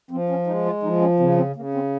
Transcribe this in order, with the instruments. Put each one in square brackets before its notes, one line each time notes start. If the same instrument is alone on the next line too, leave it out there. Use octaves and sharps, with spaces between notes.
[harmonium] F3 C4
C#4
G#3 D#4
F4
F3 D#4
C#4
C#3 C4
C4
C#3 A#3
C4